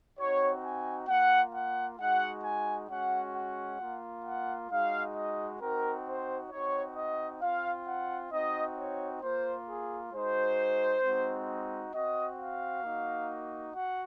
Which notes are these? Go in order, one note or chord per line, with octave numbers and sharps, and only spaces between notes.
C4 D#4 F#4 C#5
G#5
A#3 F4 F#5
F#5
G#3 D#4 F#4 F#5
G#5
G#3 C#4 F#4 F#5
F#5
A#3 F4
F#5
G#3 D#4 F#4 F5
D#5
C4 D#4 F#4 A#4
C5
C4 D#4 F#4 C#5
D#5
C4 F4 F5
F#5
C4 D#4 F#4 D#5
C#5
A#3 F4 C5
G#4
G#3 D#4 F#4 C5
G#3 C4 D#4 F#4
C4 F#4 D#5
F5
A#3 D#4 F#4
F#4 F#5